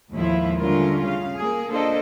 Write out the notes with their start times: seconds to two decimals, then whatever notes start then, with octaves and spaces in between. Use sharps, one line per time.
0.12 D#2 A2 F3 G#3 E4 F4
0.59 D3 G3 A3 C#4 F4 A#4
1.06 C#3 F5
1.37 A#3 G#4
1.70 A#3 D4 F4 A4 C5 D#5